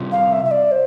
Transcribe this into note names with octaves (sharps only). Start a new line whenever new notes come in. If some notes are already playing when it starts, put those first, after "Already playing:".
Already playing: C3 G3 C4 F4
F5
E5
E5
D5
C5